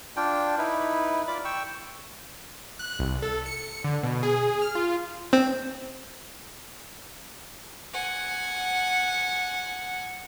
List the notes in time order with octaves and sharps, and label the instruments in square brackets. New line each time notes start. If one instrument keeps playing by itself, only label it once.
[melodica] D4 F4 G5
D#4 E4 B4
F4 D5 B5 D6
G5 C#6 E6
[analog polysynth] F#6
C2
A4
C#7
D3
B2
G#4
F6
F4
[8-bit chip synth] C4
[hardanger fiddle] F#5 G#5